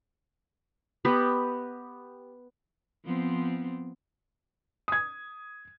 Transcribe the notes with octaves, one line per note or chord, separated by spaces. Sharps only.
B3 G4 B4 D#5
F3 B3 C4
D#6 G#6